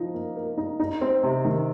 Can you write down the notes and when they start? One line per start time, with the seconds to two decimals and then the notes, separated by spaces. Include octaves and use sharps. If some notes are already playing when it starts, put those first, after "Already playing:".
Already playing: F3 D#4
0.14 A#3
0.36 A#4
0.58 D#4
0.80 D#4
1.01 C4
1.23 C3
1.45 D#3